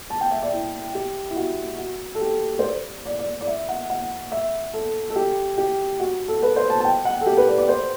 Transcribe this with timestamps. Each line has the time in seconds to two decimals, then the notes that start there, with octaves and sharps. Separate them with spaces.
0.10 A5
0.21 G5
0.31 E5
0.42 D5
0.53 E4
0.95 G4
1.30 E4
1.36 F#4
1.78 F#4
2.15 A4
2.21 G4
2.59 C5
2.63 D5
3.05 D5
3.19 D5
3.41 D5
3.47 E5
3.69 F#5
3.90 F#5
4.32 E5
4.73 A4
5.10 A4
5.16 G4
5.58 G4
6.00 F#4
6.28 A4
6.42 B4
6.56 C5
6.70 A5
6.80 A5
6.85 G5
7.05 F#5
7.21 A4
7.27 G4
7.37 B4
7.48 D5
7.58 D5
7.69 C5